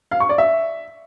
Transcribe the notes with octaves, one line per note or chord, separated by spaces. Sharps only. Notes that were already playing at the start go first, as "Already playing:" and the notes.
F5
C#6
D5
E5